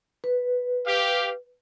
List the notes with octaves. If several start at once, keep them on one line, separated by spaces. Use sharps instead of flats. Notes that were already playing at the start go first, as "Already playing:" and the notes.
B4
G4 F5